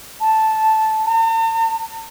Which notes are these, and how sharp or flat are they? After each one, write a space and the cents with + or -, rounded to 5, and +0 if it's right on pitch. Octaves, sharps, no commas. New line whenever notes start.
A5 -5
A5 +45